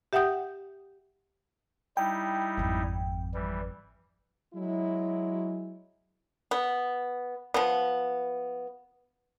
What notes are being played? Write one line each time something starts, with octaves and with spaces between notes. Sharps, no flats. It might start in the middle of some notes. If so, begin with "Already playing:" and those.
G4 E5 F#5 G5 D#6 G6
G3 D#4 E4 G5
G#1 F2
E3 G3
F#3 G#3 E4
B3
F3 B3